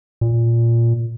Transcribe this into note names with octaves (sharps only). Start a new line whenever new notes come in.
A#2